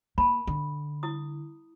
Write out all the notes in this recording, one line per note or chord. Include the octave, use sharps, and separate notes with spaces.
A#3 A5 B5
D3
E4 D#6